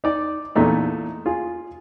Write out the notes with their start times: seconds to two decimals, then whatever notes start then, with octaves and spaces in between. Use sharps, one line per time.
0.04 D#4 D5
0.55 E2 A#2 A3 D#4
1.26 F4 G#4